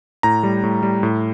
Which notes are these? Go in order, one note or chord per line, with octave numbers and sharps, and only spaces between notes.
A2 A#5
G3
A2
G3
A2